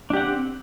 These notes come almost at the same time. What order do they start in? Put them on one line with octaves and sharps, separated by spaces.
D4 G4 F#5 C4